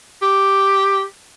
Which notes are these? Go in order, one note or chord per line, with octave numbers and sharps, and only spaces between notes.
G4